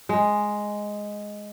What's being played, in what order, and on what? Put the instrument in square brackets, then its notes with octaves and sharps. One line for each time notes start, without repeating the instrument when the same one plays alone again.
[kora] G#3